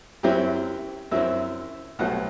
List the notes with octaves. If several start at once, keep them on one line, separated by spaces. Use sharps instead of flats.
F#2 F#3 C4 E4 G4
F#2 F#3 C4 E4 E5
C2 B2 F#3 A3 F#5